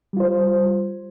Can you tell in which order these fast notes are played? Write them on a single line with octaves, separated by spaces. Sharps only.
G3 F4 C5